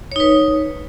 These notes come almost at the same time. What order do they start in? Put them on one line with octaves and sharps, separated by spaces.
C#5 D#4 B4